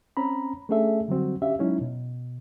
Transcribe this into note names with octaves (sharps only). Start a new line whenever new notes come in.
C4 C#4 A#5 B5
A3 C#4 D4 G#4 A4 E5
D3 F#3 G3 C4 F#4
C#4 D4 G4 E5 F5
F#3 G#3 C#4 D#4 E4
B2